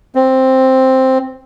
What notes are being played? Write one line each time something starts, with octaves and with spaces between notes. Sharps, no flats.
C4